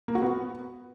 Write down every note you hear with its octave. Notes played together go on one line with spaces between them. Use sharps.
A#3
F#4
B3